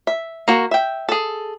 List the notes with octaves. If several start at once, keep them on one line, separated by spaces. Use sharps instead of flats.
E5
A#3 F#4
E5 G5
G#4 A4